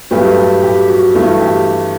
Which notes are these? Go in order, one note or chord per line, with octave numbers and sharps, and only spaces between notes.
G2 F#3 A3 G4 B4
G4
G4
F#4
G2 E3 A3 F#4
G4